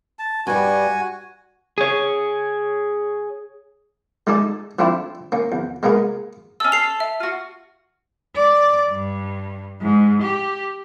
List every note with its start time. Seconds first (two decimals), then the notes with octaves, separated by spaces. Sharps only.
0.19 A5
0.47 G2 G3 F#4 G#5
1.78 G#4 C#5
4.27 G#3 A3 D#4 G#4 A4 D5
4.79 F3 A3 C4 D4 E4
5.32 A#3 C#4
5.52 E2
5.83 G#3 A#3 B3 G#4 A#4
6.60 C#4 A4 E6
6.72 A4 C7 F7
7.00 E5
7.20 F4 F#4
8.36 D5
8.91 G2
9.81 G#2
10.22 G4